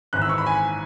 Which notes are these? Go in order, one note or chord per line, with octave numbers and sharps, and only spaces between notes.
G#1 G#2 E3 F#6
E6
C#6
B5
G#5